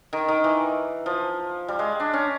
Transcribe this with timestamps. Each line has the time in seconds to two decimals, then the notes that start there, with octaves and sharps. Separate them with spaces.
0.13 D#3
0.28 D#3
0.44 E3
1.06 F3
1.68 G3
1.79 G#3
2.00 D4
2.14 C#4